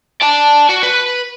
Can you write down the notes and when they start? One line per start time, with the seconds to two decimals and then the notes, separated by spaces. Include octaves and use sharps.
0.22 D5 A5
0.69 F#4
0.83 B4